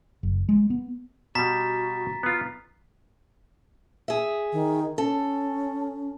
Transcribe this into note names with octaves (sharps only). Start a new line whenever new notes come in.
F#1
G#3
B3
B2 G3 F#4 A#5 A6 B6
B3 F4
G#4 E5
D#3
C#4 A4